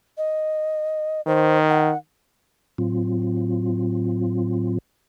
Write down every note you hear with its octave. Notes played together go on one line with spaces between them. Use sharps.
D#5
D#3 C5
F#5
A2 F#3 C4 F4